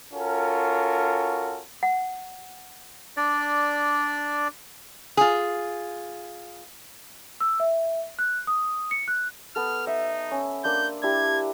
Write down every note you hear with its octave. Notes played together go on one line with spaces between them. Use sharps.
C#4 F4 F#4 A4 A#4
F#5
D4 D5
F4 G#4
E6
E5
F#6
D#6
C#7
F#6
B3 A4 F6
D#4 E5
C#4
A#3 D4 C6 G6
D4 E4 G4 G#6